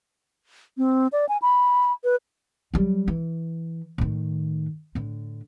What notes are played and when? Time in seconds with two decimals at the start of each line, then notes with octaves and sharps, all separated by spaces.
0.78 C4
1.12 D5
1.29 G#5
1.42 B5
2.04 B4
2.74 F#3 G3
3.08 E3
3.98 A2 D#3
4.95 A2 D3